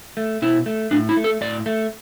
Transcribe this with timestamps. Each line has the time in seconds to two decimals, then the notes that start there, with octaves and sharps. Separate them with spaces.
0.17 A3
0.42 B2 E4
0.66 A3
0.91 A2 D4
1.09 E4
1.17 A3
1.24 A4
1.41 A2 D5
1.66 A3